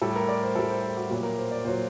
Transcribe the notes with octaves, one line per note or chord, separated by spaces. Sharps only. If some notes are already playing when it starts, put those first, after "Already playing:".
A2 G3 A4
A#4
D5
C5
A2 G3 A4
C5
A4
F#4
A#2 F#3 G4
A#4
C5
D5
A#2 F#3 C5